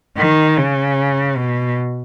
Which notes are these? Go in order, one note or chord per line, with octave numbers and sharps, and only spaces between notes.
D#3
C#3
B2